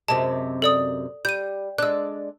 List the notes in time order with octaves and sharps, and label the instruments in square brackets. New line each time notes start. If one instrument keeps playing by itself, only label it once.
[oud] F#2 C3 G#3 [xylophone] A5
[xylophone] A4 D5 D#6
[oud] G3 [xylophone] G6 D#7
[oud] G#3 D4 [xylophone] E6 F#6